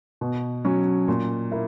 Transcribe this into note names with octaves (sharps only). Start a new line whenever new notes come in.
B2
F#3 C#4
A#2
A#3 E4